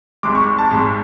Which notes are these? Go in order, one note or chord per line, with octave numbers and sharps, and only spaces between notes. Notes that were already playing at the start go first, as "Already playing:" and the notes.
G#1 G#2 G#3 D6
C#6
C#6
A5
G#1 G#2 G#3